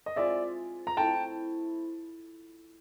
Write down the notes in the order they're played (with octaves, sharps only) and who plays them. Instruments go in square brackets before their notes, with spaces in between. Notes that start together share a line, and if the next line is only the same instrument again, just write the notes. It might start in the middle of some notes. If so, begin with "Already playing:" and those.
[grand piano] D#5
[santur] G#3 C4 F4 G#4 [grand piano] D5 E5
[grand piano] A#5
[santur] A3 C4 E4 [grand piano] G5 A5